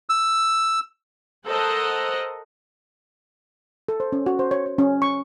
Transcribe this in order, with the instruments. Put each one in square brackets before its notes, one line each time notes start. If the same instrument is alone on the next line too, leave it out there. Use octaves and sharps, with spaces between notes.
[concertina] E6
[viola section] A4 A#4 C5 D#5 F#5
[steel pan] A4
C5
C#4
F#4
C5
C#5
C#5
C#4
C#6